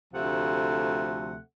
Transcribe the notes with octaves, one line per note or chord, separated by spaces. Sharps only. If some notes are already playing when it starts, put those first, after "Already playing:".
D2 C3 F3 A3 F#5